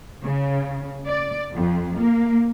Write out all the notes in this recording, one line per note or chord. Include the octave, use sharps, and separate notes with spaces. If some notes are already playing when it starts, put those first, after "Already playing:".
C#3
D5
F2
A#3